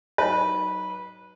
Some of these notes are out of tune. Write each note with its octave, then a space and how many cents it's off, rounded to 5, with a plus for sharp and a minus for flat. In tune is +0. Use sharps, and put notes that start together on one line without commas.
F#3 +25 D#4 +0 B4 -15